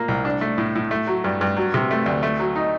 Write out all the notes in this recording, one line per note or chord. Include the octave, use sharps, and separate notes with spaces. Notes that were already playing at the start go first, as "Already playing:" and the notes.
Already playing: A#2 A#3
C2
D4
A3
A2
A2
A3
F#3
G2
G2
F#3
C3
A3
D2
A3
F#3
D#4